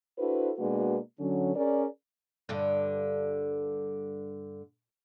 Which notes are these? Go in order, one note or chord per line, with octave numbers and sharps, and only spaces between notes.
D4 E4 F#4 A4 B4 C5
B2 G#3 A#3 D4 F#4 B4
D3 F#3 C#4
C#4 G#4 A#4 D5
G2 D3